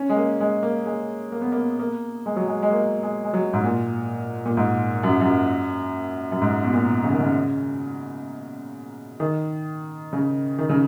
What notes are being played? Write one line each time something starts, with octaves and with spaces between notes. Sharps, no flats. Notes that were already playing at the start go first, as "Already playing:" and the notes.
Already playing: C#4
G#3
A#3
G#3
A#3
G#3
A#3
B3
A#3
A#3
G#3
F#3
G#3
G#3
A#3
G#3
G#3
F#3
G#2
A#2
A#2
G#2
F#2
F#2
F#2
G#2
B2
A#2
C#3
D#3
C#3
D#3
C#3
D#3
C#3